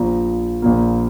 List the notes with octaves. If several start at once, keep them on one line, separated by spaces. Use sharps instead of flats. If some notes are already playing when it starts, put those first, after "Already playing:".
Already playing: A#1 A#2 F3 A#5
A#1 A#2 A#3